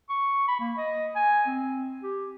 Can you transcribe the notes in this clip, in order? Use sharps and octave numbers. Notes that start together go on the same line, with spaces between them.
C#6
B5
A#3
D#5
G#5
C4
G4